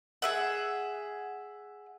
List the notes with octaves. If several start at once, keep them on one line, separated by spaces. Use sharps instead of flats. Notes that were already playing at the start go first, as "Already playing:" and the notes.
G#4 E5 F#5